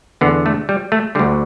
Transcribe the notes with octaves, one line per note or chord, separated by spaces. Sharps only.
E2 D3 B3
A3
G3
A3
D2 D3 G3